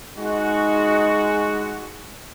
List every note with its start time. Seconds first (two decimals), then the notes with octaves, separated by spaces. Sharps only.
0.18 G#3 D#4 F#4